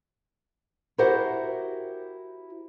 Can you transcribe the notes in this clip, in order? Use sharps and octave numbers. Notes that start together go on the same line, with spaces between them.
E4 F#4 G4 A#4 C5 F#5